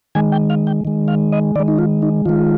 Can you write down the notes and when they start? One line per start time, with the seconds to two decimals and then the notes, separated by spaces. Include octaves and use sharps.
0.15 D#3 G#3 G#5
0.32 G5
0.50 F5
0.67 G5
0.85 D#3 G#3
1.08 F5
1.32 D#5
1.56 D#3 G#3 D5
1.68 D#4
1.79 F4
2.02 D#4
2.25 D#3 G#3 F4